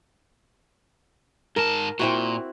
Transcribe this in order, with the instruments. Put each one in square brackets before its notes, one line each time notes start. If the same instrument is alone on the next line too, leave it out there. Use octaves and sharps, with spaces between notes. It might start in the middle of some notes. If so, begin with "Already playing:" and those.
[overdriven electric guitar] G#2 A5 [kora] A#4
[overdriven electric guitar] A#2 [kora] C4 E4 F#4